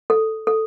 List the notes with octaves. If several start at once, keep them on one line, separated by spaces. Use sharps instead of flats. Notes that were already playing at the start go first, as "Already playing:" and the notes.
A4
A4